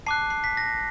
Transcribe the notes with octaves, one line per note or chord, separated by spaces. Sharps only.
A5 D6 F#6 C7
C7
B6
A#6